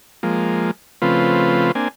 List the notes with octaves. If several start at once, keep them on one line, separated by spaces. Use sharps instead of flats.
F3 G#3 A#3
C#3 F3 A3 C4 F4 B4
A#3 C4 D4 G#5